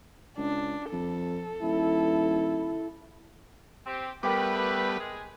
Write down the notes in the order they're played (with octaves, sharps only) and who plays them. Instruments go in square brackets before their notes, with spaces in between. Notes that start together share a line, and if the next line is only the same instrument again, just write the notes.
[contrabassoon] C#2 [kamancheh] D4
[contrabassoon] F2 [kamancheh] A4
[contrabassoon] D#1 [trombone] E4
[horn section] C4 G4
[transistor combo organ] G3 B3 [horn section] A3 B4 [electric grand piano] A#4 G5 D6
[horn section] G#3 G#4